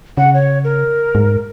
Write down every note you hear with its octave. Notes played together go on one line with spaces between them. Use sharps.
C#3 F#5
C#5
A#4
G#2